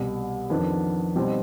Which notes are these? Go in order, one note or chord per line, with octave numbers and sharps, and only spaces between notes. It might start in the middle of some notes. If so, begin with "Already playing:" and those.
Already playing: C2 B2 G3
F2 D#3 B3 D4
B2 G3 C4 D#4